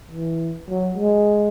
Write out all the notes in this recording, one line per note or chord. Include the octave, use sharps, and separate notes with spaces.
E3
F#3
G#3